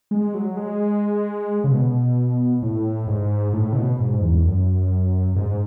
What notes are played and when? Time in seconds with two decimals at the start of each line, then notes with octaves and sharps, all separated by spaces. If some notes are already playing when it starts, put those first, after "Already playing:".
0.11 G#3
0.34 F#3
0.57 G#3
1.64 C#3
1.71 B2
2.62 A2
3.07 G#2
3.53 A2
3.73 C#3
3.76 B2
3.99 G#2
4.22 E2
4.45 F#2
5.36 G#2